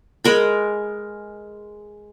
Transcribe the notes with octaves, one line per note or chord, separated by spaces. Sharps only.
G#3 A#4 B5